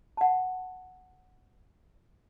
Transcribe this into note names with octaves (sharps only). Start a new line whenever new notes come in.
F#5 A5